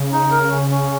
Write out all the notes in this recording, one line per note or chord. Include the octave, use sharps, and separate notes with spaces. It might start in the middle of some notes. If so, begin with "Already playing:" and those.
Already playing: C#3
D#4
A#4
C#4
C#4